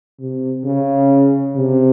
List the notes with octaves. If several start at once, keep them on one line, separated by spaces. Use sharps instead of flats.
C3
C#3
C3